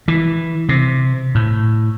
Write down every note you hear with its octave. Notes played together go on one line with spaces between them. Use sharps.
E3
C3
A2